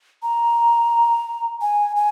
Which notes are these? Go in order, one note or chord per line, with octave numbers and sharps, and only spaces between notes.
A#5
G#5
G#5